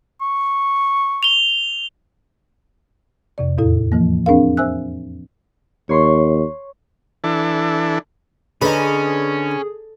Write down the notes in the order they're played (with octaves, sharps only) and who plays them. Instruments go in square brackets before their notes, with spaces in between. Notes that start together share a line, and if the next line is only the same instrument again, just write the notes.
[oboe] C#6
[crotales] F7 G7
[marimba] F2 C3 D5
E2 A2 E4 A4
E3 F3 A#3
C4 D4 G#4 A#4 F5
C5 E5 G#5 E6 F#6
[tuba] D#2 [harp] C#5 C6 C#6
[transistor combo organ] E3 D4 A4
[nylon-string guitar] D3 [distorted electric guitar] C#4 [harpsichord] D#4 B4 [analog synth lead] G#4